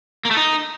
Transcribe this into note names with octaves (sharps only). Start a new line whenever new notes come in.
A#3
A3
D#4